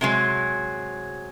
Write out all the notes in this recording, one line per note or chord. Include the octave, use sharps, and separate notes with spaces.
C3 F#3 G#3